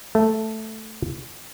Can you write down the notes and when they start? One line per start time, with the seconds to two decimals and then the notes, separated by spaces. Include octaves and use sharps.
0.15 A3